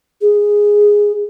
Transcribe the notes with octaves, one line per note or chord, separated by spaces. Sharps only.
G#4